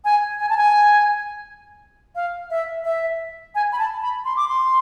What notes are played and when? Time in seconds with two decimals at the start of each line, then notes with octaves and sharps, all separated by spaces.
0.05 G#5
0.40 G#5
0.49 A5
0.57 G#5
2.15 F5
2.51 E5
2.85 E5
3.55 G#5
3.72 B5
3.79 A5
4.02 B5
4.25 C6
4.37 D6
4.48 C6